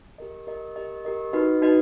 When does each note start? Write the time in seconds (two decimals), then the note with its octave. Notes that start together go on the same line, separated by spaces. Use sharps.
0.18 G4 A#4 D#5
0.47 G4 A#4 D#5
0.76 G4 A#4 D#5
1.05 G4 A#4 D#5
1.33 D#4 F#4 B4 D#5
1.62 D#4 F#4 B4 D#5